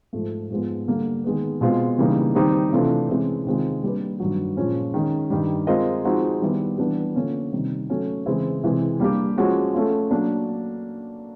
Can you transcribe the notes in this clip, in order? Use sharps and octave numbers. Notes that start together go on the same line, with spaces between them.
G#2 F3 A3
G#2 F3 G#3 B3
D3 G3 A#3
D#3 G#3 B3
B2 G#3 C4 F4
C#3 E3 G3 A#3 D#4
D#3 G3 C4 D#4 G4
C3 E3 A3 D4 F4
C3 E3 G#3 C#4
C3 D#3 G#3 C4 F4
G3 A#3 D4 G4 B4
G2 D#3 F#3
A#2 F3 G#3 C#4
D#3 G#3 C#4
G2 D#3 G3
G#3 C4 F4 A#4 D#5
F3 G#3 C4 D#4 F#4
D#3 G3 B3 E4
E3 G3 B3 D4 G4
D3 F3 A#3 C#4
C3 D#3 G3
F#3 A3 C#4 F#4
C#3 E3 G#3 C4 E4
C3 E3 G#3
G3 A#3 D4 G4
F3 G#3 C#4 F#4
A3 C#4 F4
F#3 A#3 D4